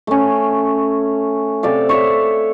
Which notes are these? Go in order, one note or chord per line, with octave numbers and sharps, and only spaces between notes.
A3 C#4
C3 A4 D5 F5
C#5 E5 C#6